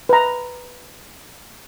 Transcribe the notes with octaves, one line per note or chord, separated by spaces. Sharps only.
B4 A#5